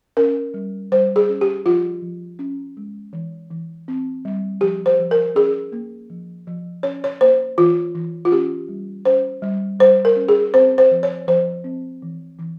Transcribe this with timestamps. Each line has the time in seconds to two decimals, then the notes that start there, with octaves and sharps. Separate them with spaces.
0.17 C#4 A#4
0.54 G3
0.92 G3 C5
1.16 G#4
1.29 C#4
1.41 G4
1.66 F3 F4
2.02 F3
2.39 C#4
2.77 G#3
3.13 E3
3.51 E3
3.88 C4
4.25 G3
4.61 F3 G4
4.86 C5
4.99 F3
5.11 A#4
5.35 C#4 G#4
5.72 A#3
6.10 F3
6.47 F3
6.83 C#4 C#5
7.04 C#5
7.21 A#3 C5
7.58 E3 F4
7.95 E3
8.25 F4
8.32 C#4 G4
8.69 G3
9.05 C#4 C5
9.42 G3
9.80 G3 C5
10.05 A#4
10.16 C#4
10.28 G#4
10.54 C4 C5
10.78 C5
10.91 F3
11.03 C#5
11.27 F3 C5
11.64 C4
12.02 E3
12.39 E3